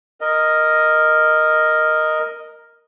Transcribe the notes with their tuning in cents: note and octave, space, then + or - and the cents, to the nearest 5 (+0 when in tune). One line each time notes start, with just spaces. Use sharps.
A#4 +0 D#5 +0